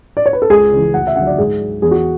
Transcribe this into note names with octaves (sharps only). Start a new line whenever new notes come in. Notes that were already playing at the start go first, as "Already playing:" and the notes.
D5
C#5
B4
A4
C#2 G#4
C#3 E3
D2 F#5
E5
D3 F#3 F#5
D5
G#2 G#4
F#3
E2 G#4
F#4